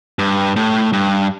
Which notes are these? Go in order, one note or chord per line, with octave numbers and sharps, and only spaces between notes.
G2
A2
G2